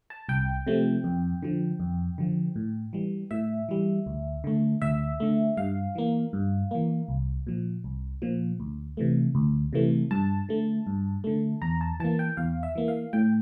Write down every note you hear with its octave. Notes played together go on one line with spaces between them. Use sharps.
A5
C2 G5
C3 F3 A3
F2
D3 F3
F2
D3 F3
A2
E3 G3
A2 E5
E3 G3
D2
D3 A3
D2 E5
D3 A3
G2 F5
E3 A#3
G2
E3 A#3
C2
A#2 F3
C2
A#2 F3
D2
C3 E3 A3
D2
C3 E3 A3
G2 A5
D3 A3
G2
D3 A3
E2 A#5
A5
E3 A#3 A5
G5
E2 F5
E5
E3 A#3
F5
A2 G5